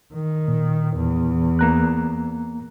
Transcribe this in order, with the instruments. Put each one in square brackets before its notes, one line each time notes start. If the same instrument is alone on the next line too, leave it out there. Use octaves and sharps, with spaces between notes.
[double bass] D#3
[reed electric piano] A#2
[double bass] E2
[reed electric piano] A#3 A#5 F#6